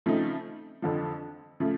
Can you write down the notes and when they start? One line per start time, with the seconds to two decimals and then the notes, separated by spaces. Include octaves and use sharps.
0.06 C#3 F3 A3 C4 D#4
0.82 F2 D3 F3
1.60 C#3 F3 A3